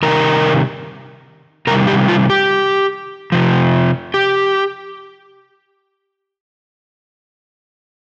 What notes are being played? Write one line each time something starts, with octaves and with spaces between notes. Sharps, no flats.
C3 D#3 G3 A#4
C3 D#3 G3 A#4
G4
F4
G4
C3 F3
G4